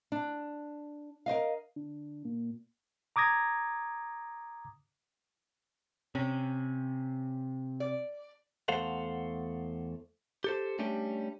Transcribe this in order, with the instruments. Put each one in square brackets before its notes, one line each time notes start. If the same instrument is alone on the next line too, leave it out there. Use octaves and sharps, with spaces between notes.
[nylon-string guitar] D4
A#4 C5 D#5 F5
[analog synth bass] D3
A#2
[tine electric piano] A#5 D6 D#6 G#6 A#6
[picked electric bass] C3 [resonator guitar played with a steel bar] C#4
[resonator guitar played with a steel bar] D5
[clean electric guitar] E2 A3 A4 C5 F5 F#5
G4 A4 C5
G3 A3 C#4 D4 G4